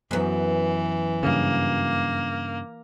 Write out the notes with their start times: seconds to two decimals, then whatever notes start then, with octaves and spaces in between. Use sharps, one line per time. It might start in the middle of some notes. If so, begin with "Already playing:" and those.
0.11 F#2 E3 B3
1.23 G2 C#3 A#3